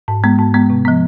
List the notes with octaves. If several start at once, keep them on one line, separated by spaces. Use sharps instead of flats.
G#2
G#3 B3
G#2
G#3 B3
C3
F3 B3